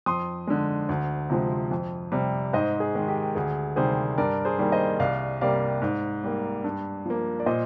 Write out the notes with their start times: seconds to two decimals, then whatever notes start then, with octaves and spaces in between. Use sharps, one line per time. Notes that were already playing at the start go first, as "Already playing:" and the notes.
0.06 F2 C6 D#6
0.47 D3 G#3
0.89 D2
1.30 C3 F3 G#3
1.71 F2
2.12 C3 G3
2.53 G#2 C5 D#5
2.80 G#4
2.95 D#3 G#3
3.08 G4
3.35 D2 G#4
3.76 C3 D#3 G3 G#4 C5
4.18 G2 A#4 D5
4.45 G#4 C5
4.58 D#3 G3 A#3
4.72 C5 D#5
4.99 C2 D5 F5
5.41 C3 G3 A#3 D5 F5
5.82 G#2
6.24 G3 A#3
6.64 G2
7.06 F3 A#3
7.40 D5
7.46 A#2 C5 D#5